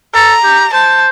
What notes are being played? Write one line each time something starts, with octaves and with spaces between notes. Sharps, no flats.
A4 A#5
G4
C5 A5